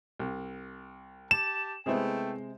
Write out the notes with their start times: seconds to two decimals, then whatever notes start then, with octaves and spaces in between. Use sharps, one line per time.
0.19 C2
1.31 G4 A5 E7
1.86 C3 G#3 A3 B3 E4 G#4 C5 G5